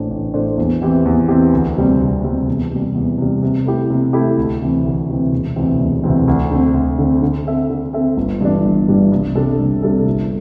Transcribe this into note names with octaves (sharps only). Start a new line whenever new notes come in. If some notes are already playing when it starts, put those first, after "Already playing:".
Already playing: A1 A2 A3 D4 C5
A1
A2 A3 D4 C5
E2
E3 C4 G4
E2
E3 C4 G4
D2
C3 G3 C4
D2
C3 G3 C4
E2
C3 G3
E2
C3 G3
C3
A3 E4 G4
C3
A3 E4 G4
D2
C3 E3 C4
D2
C3 E3 C4
E1
D2 C3 E3 C4
E1
D2 C3 E3 C4
D2
D3 C4
D2
D3 C4
D3
C4 A4 E5
D3
C4 A4 E5
G1
G2 E3 G3 D4
G1
G2 E3 G3 D4
C2
C3 G3 D4 A4
C2
C3 G3 D4 A4
G1